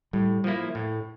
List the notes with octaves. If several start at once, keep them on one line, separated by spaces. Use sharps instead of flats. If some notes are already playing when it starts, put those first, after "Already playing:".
A2 G3
F3 A#3 E4
A2